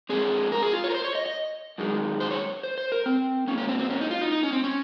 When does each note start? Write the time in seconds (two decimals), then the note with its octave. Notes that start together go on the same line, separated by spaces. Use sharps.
0.09 F2 C#3 G#3 C4 G#4
0.52 A#4
0.62 G#4
0.73 F4
0.84 C#5
0.90 A#4
0.95 C5
1.05 C#5
1.15 D#5
1.26 D#5
1.78 F#2 D#3 G#3
2.20 C5
2.31 C#5
2.63 C5
2.78 C5
2.92 A#4
3.06 C4
3.47 G#2 D#3 A#3 C#4
3.58 C#4
3.69 C4
3.79 C4
3.90 C#4
4.01 D#4
4.11 F4
4.21 D#4
4.32 D#4
4.43 C#4
4.53 C4
4.64 C#4